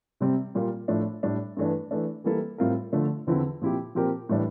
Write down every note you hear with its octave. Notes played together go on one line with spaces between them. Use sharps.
C3 G3 C4
A#2 G3 A#3 F4
A2 F3 A3 D4
A2 G3 D4
G2 E3 A3 D4
E3 A3 D4
E3 G3 A#3 E4 A4
A2 G3 C4 F4 A#4
D3 F3 A3 D4 A4
E2 D3 F3 C4 E4
A#2 F3 C4 E4 G4
A#2 F3 C4 G4 A#4
A2 E3 G3 D4